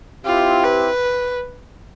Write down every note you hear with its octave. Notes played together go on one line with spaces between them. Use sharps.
C4 E4 F4 G4
B4